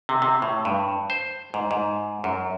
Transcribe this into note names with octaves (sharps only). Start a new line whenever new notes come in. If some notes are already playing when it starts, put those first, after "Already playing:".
C3
C3
A2
G2
C5
G#2
G#2
F#2